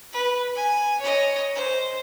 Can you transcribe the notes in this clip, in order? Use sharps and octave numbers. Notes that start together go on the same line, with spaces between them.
B4
G#5
C#5 D#5
C5